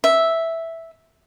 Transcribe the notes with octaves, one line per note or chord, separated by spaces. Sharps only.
E5